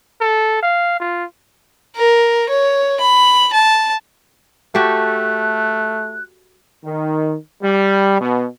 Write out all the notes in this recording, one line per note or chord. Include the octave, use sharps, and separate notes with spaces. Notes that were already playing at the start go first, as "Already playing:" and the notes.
A4
F5
F4
A#4
C#5
B5
A5
A3 F#4 G4 A4 F#6
D#3
G3
B2